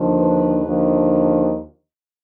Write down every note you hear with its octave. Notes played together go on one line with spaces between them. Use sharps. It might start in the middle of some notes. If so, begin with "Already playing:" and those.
Already playing: D#2 D3 F3
B4
D#2 D3 F3